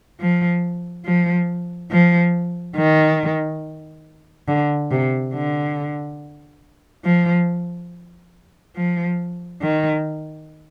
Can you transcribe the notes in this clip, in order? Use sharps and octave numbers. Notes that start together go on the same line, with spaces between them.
F3
F3
F3
D#3
D3
C3
D3
F3
F3
D#3